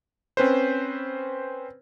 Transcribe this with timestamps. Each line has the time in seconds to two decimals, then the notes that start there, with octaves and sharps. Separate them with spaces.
0.37 C4 C#4 B4 C5